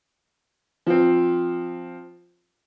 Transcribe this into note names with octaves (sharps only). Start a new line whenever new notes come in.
F3 C4